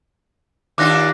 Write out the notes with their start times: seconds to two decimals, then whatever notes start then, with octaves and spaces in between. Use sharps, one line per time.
0.78 D#2 D4 F4 D6 F#6 A#6